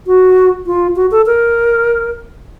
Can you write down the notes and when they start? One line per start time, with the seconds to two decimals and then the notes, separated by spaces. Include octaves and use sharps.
0.07 F#4
0.66 F4
0.96 F#4
1.11 A4
1.26 A#4